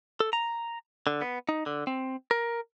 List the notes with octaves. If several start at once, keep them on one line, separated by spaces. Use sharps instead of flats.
A4
A#5
D3
B3
D#4
D3
C4
A#4